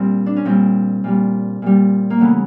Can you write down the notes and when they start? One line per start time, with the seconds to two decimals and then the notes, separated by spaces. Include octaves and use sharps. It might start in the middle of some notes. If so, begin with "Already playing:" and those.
Already playing: A#2 G3 C4
0.26 D4
0.36 C#4
0.45 A#2 G3 C4
1.04 A#2 G3
1.62 A#2 G3
2.10 A#3
2.20 C#3 E3 A3 B3